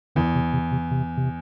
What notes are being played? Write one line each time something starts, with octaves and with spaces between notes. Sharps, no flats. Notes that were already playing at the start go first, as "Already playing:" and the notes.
E2 D3
C3
C3
C3
C3
C3